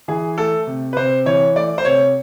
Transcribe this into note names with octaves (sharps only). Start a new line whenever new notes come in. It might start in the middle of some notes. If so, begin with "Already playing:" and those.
E3 G#4
A3 A4
C3
B4
C3 C5
E3 C#5
A3 D5
C5
C3 C#5